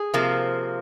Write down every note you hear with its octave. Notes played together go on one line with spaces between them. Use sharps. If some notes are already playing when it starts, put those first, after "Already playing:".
Already playing: G#4
C3 F3 A#3